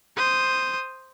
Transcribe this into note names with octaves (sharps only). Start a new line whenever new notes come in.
C5 D#6